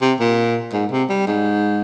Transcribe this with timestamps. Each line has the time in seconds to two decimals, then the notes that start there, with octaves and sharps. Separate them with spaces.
0.02 C3
0.20 A#2
0.73 G#2
0.91 C3
1.10 G3
1.27 G#2